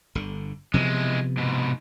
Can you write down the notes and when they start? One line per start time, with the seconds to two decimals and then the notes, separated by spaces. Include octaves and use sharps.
0.15 G1 D3
0.74 C3 E3 F3 G#3 B3
1.37 G#2 B2